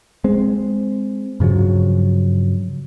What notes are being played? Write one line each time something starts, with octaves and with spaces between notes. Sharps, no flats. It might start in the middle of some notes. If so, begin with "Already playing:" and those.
G#3 C4
G2 C#3 F3 F#3